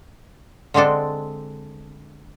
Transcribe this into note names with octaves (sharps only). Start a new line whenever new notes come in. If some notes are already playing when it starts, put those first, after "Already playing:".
D3 G#3 C4 D4 A4